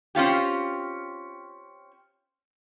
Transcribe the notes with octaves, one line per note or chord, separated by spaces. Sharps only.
C4 C#4 F4 G4